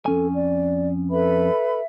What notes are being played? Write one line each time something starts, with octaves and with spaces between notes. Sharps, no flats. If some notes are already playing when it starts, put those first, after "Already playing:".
F2 C#4 A4 G#5
D5
A4 B4 E5 B5